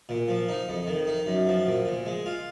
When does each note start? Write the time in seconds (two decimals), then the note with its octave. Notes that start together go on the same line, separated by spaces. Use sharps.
0.09 A#2
0.28 F3
0.49 D#4
0.69 F2
0.87 D#3
1.07 D#4
1.26 F#2
1.47 F3
1.67 A#2
1.86 A#2
2.06 G#3
2.26 F4